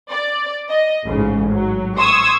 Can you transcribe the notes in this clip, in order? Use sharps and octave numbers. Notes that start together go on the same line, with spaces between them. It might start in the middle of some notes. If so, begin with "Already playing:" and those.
D5
D#5
A1 G#2 C#3
F#3
C6 C#6 D#6 E6 G#6